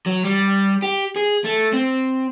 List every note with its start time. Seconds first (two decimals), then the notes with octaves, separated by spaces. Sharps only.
0.06 F#3
0.25 G3
0.82 G4
1.16 G#4
1.44 A3
1.73 C4